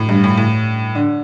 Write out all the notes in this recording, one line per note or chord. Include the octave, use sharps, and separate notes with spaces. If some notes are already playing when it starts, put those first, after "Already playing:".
Already playing: A2
G2
A2
A2
D3